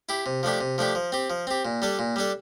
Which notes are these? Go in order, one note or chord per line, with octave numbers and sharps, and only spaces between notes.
E4 G4
C3
F3 A3 D4 G4
C3
F3 A3 D4 G4
F3
C4 G4
F3
C4 G4
A#2
G3 D4 A4
A#2
G3 D4 A4